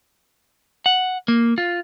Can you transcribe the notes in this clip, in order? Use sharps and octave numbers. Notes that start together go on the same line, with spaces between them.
F#5
A#3
F4